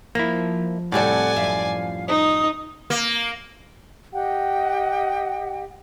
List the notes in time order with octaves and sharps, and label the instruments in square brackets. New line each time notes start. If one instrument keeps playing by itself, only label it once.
[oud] F3 [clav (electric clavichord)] A#3 E4
[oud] D#2 C3 A4 [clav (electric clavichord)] A2 G3 [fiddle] D5 G#5 [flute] F#5
[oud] F#2 F3 E5 [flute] F5
[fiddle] D#4 [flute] D#6
[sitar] A#3
[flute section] G4 D#5 F#5 G5